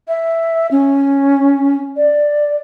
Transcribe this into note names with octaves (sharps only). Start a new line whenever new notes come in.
E5
C#4
D5